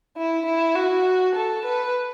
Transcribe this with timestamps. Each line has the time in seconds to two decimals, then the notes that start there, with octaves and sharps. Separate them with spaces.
0.17 E4
0.46 E4
0.75 F#4
1.35 A4
1.65 B4